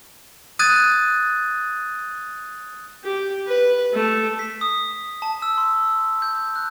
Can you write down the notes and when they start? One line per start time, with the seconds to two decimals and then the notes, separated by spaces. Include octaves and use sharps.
0.59 D#6 F#6 G#6 A6 D#7
3.04 G4
3.47 B4
3.94 A3
4.39 B6
4.61 D#6
5.22 A5
5.42 E6
5.58 C6
6.22 G6
6.56 F#6